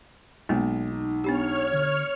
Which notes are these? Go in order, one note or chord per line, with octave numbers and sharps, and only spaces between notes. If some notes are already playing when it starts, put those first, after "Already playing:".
B1 G#3 A#3 B3
D#4
B3 D4 G4 C#5 F6
D3